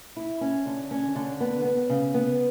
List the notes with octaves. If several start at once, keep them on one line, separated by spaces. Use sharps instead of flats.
E4
C#4
D3
C#4
D3
B3
B3
C#3
B3